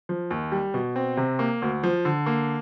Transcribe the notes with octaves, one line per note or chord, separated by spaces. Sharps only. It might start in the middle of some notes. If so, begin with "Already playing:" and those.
F3
D#2
G3
B2
C4
C3
A#3
D2
F3
D3
A#3